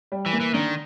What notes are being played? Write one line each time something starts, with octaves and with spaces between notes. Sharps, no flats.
G3
E3
A#3
E3
D3 D#3